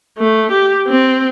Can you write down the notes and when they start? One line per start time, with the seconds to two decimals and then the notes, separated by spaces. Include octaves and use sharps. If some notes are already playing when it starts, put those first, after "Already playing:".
0.18 A3
0.52 G4
0.87 C4